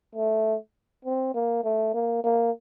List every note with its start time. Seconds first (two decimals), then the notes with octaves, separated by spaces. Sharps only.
0.15 A3
1.05 C4
1.34 A#3
1.64 A3
1.94 A#3
2.24 A#3